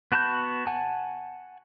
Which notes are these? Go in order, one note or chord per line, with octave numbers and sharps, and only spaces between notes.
B3 F#4 A5 B5 G6
F#5 G#5 A5